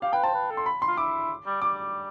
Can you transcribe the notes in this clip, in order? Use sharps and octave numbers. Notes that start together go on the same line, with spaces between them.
G4 F5
B4 G5
C5 A5
B4
A4
C6
B5
C6
F4
E4 D6
G3
G3 D6